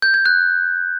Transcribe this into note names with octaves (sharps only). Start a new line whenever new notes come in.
G6
G#6
F#6